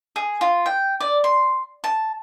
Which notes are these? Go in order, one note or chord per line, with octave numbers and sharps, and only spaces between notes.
G#4
F4
G5
D5
C6
A5